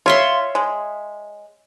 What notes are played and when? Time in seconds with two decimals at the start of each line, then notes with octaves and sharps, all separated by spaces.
0.06 F4 C#5 E5 C6
0.55 G#3